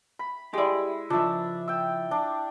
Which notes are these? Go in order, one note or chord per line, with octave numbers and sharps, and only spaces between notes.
B5
G#3 E4 G4 D5
C#3 F3 D4 F4 E5
G5 E6
D4